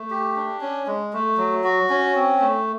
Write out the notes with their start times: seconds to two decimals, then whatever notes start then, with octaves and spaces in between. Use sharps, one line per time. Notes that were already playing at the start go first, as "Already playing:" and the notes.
Already playing: A3
0.10 G4
0.36 D4
0.61 C#4
0.87 G#3
1.13 A3
1.38 F#3
1.64 F#4
1.90 C#4
2.15 C4
2.40 A3